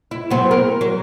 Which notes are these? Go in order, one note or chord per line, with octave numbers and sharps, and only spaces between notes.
E4
F#3 B3 C4
A#4
F#3